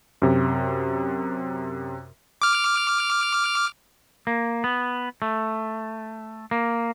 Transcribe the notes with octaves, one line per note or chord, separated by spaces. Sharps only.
F#2 C3
D6 F6
A#3
B3
A3
A#3